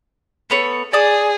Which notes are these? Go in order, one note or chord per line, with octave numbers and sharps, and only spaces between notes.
A3 B3 C#5
G#4 D5 A5 D#6